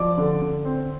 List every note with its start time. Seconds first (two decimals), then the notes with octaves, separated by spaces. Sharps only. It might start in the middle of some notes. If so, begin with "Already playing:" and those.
Already playing: F3 D5 D6
0.17 D3
0.41 D3
0.65 C4